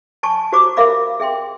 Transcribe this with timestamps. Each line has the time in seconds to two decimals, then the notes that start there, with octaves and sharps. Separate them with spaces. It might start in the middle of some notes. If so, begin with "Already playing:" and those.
0.23 G#5 A5 C#6
0.52 F#4 G4 C5 A#5 C#6 D6
0.77 A#4 E5 F5 B5 D6
1.20 G#4 E5 G5 C6